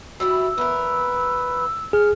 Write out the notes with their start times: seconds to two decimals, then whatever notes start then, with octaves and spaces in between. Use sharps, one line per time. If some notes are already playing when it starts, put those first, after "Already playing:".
0.20 F#3 G3 E4 E6
0.58 E2 A#4 B4
1.93 G#4 F6